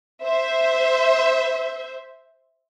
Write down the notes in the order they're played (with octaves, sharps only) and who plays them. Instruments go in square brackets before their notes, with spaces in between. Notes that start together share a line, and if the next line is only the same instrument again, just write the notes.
[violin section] C5 E5